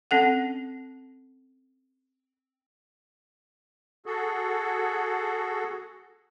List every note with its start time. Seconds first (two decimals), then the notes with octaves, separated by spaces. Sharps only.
0.11 C4 C#4 A4 F#5
4.06 F#4 G#4 A4